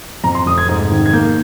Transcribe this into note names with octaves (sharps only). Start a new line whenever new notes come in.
F2 A#5
C6
F1 D#6
G#6
G#2
D#3
G#6
A#3 G6